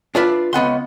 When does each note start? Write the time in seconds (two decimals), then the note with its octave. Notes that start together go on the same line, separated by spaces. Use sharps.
0.15 D4 F4 B4 E5
0.53 C#2 B3 F#5 C6